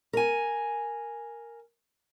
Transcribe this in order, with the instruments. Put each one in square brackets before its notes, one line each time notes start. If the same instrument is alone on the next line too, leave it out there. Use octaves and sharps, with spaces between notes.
[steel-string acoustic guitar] A#4 G#5